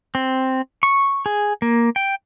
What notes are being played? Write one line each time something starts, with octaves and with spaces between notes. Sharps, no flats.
C4
C#6
G#4
A#3
G5